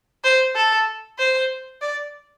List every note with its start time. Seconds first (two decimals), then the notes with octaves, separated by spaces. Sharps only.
0.24 C5
0.56 A4
1.19 C5
1.82 D5